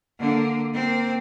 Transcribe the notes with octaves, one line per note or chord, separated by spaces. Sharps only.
D3 A#3
A#3 C4